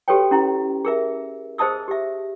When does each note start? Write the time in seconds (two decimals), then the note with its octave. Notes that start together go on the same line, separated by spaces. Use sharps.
0.08 F#4 G4 A4 B4 C#5 G5
0.31 C#4 E4 G4 A#5
0.85 G#4 A#4 E5
1.58 G#4 C5 D#5 A5 D#6 E6
1.88 G4 E5